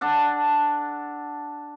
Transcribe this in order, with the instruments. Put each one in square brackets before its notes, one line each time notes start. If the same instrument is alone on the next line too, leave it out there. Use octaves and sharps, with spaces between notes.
[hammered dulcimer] D4 A4 F#5